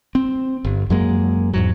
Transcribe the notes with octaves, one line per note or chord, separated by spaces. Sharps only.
C4
G1
F#2 F#3 G#3 A#3
E2 G#2 F#3